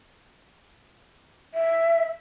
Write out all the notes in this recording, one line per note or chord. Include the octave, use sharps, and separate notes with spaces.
E5